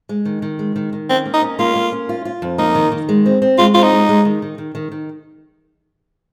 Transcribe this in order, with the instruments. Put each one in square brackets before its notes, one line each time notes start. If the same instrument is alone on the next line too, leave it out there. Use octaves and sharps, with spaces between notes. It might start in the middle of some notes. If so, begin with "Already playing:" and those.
[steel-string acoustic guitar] G#3
D#3
D#3
G#3
D#3
D#3
[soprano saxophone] C4 [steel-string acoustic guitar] C#4
[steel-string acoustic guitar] A#3
[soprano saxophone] D#4
[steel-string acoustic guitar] C#4
[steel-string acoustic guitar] A#3 [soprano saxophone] F4
[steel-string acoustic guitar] A#3
C#4
F4
F4
F2
[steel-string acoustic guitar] A#3 [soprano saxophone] D#4
[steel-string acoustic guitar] D#3
D#3
G#3
C4
C4
[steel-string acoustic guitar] G#3 [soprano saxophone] F4
[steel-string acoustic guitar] C4 [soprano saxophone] F4
[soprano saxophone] D#4
[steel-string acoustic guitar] G#3
G#3
D#3
D#3
D#3
D#3
D#3